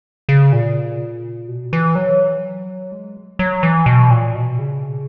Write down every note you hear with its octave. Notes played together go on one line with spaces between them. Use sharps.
C#3
A#2
B2
E3
F#3
G#3
F#3
E3
B2
A#2
B2
C#3